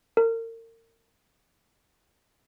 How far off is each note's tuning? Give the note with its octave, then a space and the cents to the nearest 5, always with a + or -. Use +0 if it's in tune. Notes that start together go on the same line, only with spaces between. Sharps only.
A#4 -35